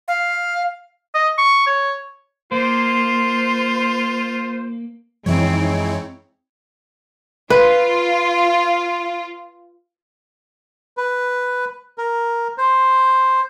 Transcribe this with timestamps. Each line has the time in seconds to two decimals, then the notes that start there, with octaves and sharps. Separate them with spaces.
0.08 F5
1.15 D#5
1.38 C#6
1.67 C#5
2.52 A#3 F4 C5
5.26 F#2 E3 F3 G#3 C4 D#4 E4 C#5
7.50 F4 B4
10.97 B4
11.98 A#4
12.58 C5